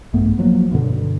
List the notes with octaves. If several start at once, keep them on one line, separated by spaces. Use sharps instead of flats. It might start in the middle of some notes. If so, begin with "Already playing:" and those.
A#1 G2 A3 B3
F3 F#3 A#3
G2 B2 D3